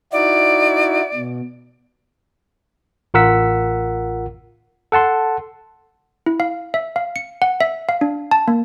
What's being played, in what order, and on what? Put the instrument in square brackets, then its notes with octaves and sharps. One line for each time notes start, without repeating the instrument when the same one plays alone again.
[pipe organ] D#4 E4 F#4 [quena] D5
[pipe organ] B2
[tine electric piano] A1 F4 A#4 F#5 E6 B6
A4 F#5 A5 C6
[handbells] E4
F5
E5
F5
C#7
F#5
E5
F5
D4
A5
A#3